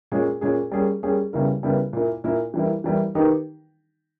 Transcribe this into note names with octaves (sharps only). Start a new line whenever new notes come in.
A#2 G#3 C#4 G#4
A#2 G#3 C#4 G#4
G3 A#3 C#4 G#4
G3 A#3 C#4 G#4
C#3 G3 B3 E4 A#4
C#3 G3 B3 E4 A#4
A#2 A#3 E4 A#4
A#2 A#3 E4 A#4
E3 G3 A#3 E4
E3 G3 A#3 E4
D#3 A#3 D#4 G4 B4